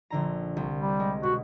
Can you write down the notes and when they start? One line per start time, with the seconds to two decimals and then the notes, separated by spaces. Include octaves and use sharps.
0.10 A#1 D3 A#5
0.57 C2
0.79 G3
1.00 G#3
1.23 B2 F#4